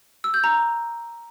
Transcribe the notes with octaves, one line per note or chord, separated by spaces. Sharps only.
E6
G6
A#5